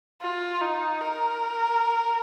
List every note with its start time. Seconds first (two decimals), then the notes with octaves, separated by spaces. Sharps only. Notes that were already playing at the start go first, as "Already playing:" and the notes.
0.22 F4
0.62 D#4
1.01 A#4